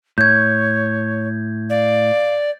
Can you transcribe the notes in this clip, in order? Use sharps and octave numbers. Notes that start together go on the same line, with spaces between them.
A2 C#5 G6 G#6
D5 F5